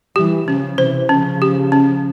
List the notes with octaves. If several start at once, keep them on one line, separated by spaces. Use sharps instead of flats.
E3 G3 G4
C#3 F3 C#4
C3 E3 C5
C#3 F3 C#4
G4
C#4